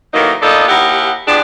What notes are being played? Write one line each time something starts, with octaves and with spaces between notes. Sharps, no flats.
A2 D#3 E3 F#3 A#3 D#4
A#3 B3 D4 D#4 F4 A4
D#2 D#4 E4 G4 F#5
E3 F3 B3 D4 G4 G#4